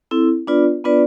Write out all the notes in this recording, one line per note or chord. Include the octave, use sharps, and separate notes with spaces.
C4 E4 A4
B3 D4 F4 B4 D5
B3 D4 F4 B4 D5